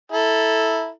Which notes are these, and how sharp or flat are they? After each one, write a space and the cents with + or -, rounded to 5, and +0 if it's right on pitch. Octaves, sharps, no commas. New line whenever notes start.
E4 -10 A4 +0 A#5 +0